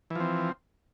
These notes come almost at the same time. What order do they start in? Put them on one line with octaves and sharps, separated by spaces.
E3 F3 C4